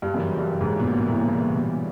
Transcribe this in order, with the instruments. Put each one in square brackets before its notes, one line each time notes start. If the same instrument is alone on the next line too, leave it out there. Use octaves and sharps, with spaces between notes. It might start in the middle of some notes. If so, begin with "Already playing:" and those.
[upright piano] G2
[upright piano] F#2 [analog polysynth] C#3 E3 G3
[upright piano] G2
G#2
B2
A#2
A2
A#2
B2